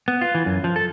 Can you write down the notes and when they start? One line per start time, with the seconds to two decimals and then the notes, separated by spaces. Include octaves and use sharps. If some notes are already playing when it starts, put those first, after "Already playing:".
0.08 B3
0.21 F4
0.35 E3
0.46 F#2
0.64 F3
0.76 A4